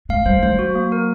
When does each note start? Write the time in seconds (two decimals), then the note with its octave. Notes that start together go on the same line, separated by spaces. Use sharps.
0.09 G#3 F5
0.26 G3 C5
0.43 F#3 C5
0.59 F#4
0.75 A#3
0.92 A#4